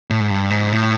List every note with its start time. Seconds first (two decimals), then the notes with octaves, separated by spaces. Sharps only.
0.10 A2
0.20 G#2
0.30 G2
0.50 G#2
0.72 A2